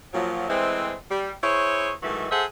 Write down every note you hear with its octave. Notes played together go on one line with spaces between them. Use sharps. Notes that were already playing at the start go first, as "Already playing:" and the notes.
A#2 F3 F#3
E3 G#3 A3 C4
G3
E4 G#4 C5 C#5
G#2 D#3 E3 F#3 A3
G#4 A4 C5 E5 F#5